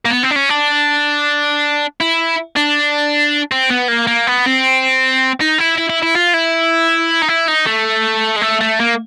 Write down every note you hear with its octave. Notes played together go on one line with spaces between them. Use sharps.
A#3
B3
C4
D4
C#4
D4
E4
D4
C4
B3
A#3
A#3
B3
C4
D#4
E4
E4
E4
E4
F4
E4
D#4
E4
D#4
A3
G#3
A3
A3
A#3